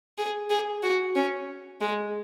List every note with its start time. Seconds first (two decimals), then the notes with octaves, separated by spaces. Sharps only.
0.18 G#4
0.50 G#4
0.83 F#4
1.15 C#4
1.81 G#3